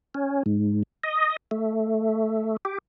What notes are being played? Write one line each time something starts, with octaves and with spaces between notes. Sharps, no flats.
C#4
G#2
D#5
A3
G4